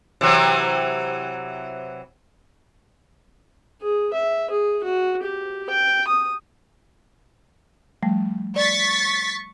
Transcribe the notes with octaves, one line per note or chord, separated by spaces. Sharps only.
C3 E3 F#3
G#4
E5
G#4
F#4
G4
G5
D#6
F3 G3 A3
D5 C#6 A6 B6